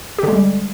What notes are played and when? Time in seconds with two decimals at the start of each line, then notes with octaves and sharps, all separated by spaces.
0.18 G4
0.23 D3
0.28 G#3
0.33 G3